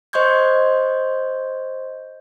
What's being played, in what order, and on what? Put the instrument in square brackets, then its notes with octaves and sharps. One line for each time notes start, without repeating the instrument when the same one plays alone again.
[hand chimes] C5 D#5 C6 C#6 G6 G#6